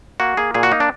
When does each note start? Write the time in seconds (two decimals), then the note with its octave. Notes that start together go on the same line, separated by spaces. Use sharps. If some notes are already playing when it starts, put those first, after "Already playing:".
0.20 A#3 F#4
0.37 A#3 G#4
0.54 A#2 G#4
0.63 F#4
0.72 A#3 D#4
0.80 D4